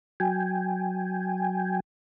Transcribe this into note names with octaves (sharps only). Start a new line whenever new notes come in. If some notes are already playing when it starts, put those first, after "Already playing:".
F#3 G5 G#5